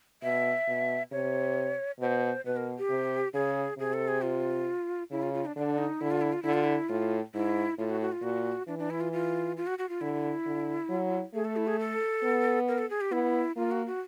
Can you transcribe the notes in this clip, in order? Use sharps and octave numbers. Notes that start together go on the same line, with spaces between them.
B2 E5
B2
C3 C#5
B2 C5
B2 B4
A#4
G4
C3
C#3 G#4
C3 G#4
A4
G#4
F4
C#3 E4
F4
F4
D4
D3 D4
D#4
D3 E4
F4
E4
F4
D3 E4
F4
E4
A2 F4
G#2 E4
A2 F4
F#4
F#4
F4
A#2 F#4
E3 D4
D4
E4
F4
F4
F4
F#4
F#4
F4
D3 E4
D3
F#3
A3 G#4
A4
E4
G#4
A4
B3
A#4
A4
G#4
G4
B3 E4
A#3 F4
F#4
F#4